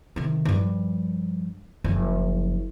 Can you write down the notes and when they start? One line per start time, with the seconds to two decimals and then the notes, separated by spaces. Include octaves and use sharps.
0.16 C3 D#3
0.45 G2 F3
1.84 F#1 F3